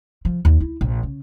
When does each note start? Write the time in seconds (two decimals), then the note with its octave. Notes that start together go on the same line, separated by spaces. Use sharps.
0.25 F3
0.45 D#2
0.60 E4
0.81 A#1
1.03 C#3